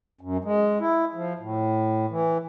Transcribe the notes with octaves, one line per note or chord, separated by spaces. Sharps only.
F#2
G#3
E4
F3
A2
E3